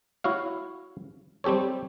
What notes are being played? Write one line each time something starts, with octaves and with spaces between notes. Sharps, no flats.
E4 F#4 C#5 F5
G3 C4 G4 A4 C#5